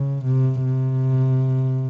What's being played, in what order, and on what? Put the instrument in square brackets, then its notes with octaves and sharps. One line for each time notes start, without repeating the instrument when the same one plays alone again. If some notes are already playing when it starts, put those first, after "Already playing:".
Already playing: [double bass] C#3
C3
C3